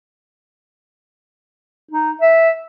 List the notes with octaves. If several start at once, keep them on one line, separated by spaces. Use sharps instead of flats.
D#4
E5